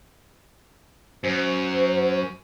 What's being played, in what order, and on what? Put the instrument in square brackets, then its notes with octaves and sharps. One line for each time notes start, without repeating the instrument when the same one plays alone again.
[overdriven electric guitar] F#2 [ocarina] C5